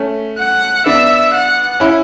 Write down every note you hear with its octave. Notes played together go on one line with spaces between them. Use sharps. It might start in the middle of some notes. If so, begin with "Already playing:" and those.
Already playing: A3 C#4
F#5
B3 D4 E5
F#5
C#4 E4